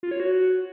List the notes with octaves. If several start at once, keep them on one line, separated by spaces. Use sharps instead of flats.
F4
C#5
F#4